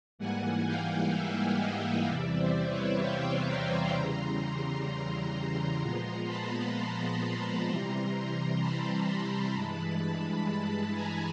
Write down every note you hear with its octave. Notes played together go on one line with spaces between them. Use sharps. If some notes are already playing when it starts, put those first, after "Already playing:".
G#2 E3 G3 A#3 F#5 G#5
F5 G5
E5 F#5
D#5 F5
E2 C3 E3 G3 D5 E5
C5 D5
B4 C#5
F5 G5
A#5 C6
E2 C#3 E3 G3
A#2 F3 G#3 B3 A#5 C6
A5 B5
A#5 C6
C3 E3 G3
A5 B5
G2 E3 G#3
A5 B5
G#5 A#5